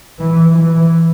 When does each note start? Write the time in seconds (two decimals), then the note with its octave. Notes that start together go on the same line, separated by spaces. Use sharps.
0.20 E3
0.58 E3